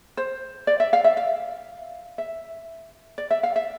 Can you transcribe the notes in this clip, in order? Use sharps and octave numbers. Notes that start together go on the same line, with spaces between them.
C5
D5
E5
F5
E5
F5
E5
D5
E5
F5
E5